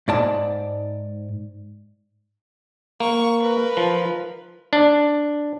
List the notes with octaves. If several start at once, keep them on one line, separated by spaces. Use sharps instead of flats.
G#2 D5 A5
A#3 C#6
A#4 B4
F3
D4